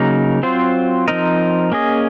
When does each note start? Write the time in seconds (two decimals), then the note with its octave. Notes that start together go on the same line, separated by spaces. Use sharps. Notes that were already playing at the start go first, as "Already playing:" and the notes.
Already playing: C#3 F#3 A#3 D#4 A#4
0.43 F#3 C4 F4 C5
1.08 F3 C4 D#4 A#4 D#5
1.72 A#3 C#4 G#4 D#5